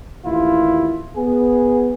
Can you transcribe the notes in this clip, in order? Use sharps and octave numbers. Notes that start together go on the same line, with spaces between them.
A1 D#2 E4 F4
B3 G#4